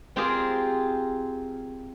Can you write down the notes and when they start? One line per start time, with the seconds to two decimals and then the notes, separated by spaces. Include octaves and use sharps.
0.16 C4 F4 G4 G#4 A#4